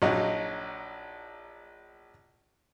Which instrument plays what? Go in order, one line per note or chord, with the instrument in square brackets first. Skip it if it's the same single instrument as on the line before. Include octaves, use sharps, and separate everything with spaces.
[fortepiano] A#1 F#3 D#4